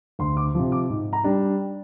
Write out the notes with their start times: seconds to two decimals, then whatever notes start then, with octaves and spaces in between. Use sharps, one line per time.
0.19 D2 C6
0.37 D6
0.55 C3 F3
0.72 D6
0.89 G#2
1.13 A#5
1.24 G3 D4